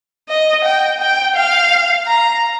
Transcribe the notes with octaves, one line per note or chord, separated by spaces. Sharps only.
D#5
G5
G5
F5
A#5